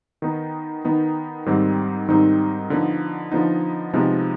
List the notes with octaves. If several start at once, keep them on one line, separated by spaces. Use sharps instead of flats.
D#3 B3 D#4
D#3 B3 D#4
G#2 D#3 G3 C4 D#4
G#2 D#3 G3 C4 D#4
D3 F3 B3 D#4
D3 F3 B3 D#4
C3 F3 G#3 B3 D#4